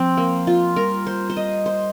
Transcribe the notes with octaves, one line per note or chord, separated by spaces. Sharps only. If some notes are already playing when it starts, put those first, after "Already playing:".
Already playing: F3 C4
A#3
F4
G3 A#4
C5
C5
D#5
C5